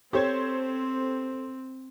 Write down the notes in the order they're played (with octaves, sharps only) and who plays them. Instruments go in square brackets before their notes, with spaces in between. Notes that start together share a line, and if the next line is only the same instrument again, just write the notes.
[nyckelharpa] C4 [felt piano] G4 C#5 [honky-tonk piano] A4 C5 G#6